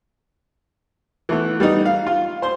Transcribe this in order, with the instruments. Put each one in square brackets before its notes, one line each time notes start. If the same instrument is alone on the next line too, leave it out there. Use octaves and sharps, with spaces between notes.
[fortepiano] E3 A3 B3
G3 B3 D#4
F5
F4
C5 C6